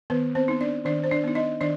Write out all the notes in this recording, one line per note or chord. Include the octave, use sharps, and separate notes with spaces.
D#3 B3 B4
C4 C5
B3 D#4
D4 D5
D#3 D4 D5
C5
D4 D5
B3 D#4
D#4 D#5
D#3 D4 D5